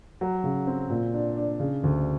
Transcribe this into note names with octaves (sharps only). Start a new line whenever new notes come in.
F#3
C#3
C4
A#2
D4
D4
C#3
D2